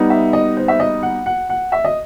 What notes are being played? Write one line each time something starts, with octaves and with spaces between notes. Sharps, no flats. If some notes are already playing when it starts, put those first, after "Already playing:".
Already playing: G3 B3 D#4
E5
D#5
C5
E5
D#5
F#5
F#5
F#5
E5
D#5